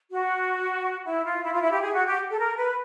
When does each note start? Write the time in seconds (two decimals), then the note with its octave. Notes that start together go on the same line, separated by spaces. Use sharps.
0.11 F#4
1.05 E4
1.24 F4
1.44 E4
1.53 F4
1.62 E4
1.71 G4
1.81 G#4
1.93 F#4
2.06 G4
2.31 A4
2.38 A#4
2.57 B4